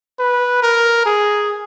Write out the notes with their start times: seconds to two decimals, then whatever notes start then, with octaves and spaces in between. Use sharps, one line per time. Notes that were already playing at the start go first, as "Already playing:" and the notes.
0.19 B4
0.62 A#4
1.06 G#4